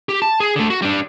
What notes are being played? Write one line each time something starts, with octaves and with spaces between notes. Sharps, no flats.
G4
A5
G#4
D3 A3
F#4
G3 D4